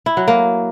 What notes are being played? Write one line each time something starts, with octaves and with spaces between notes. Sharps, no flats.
E4
F#3
A#3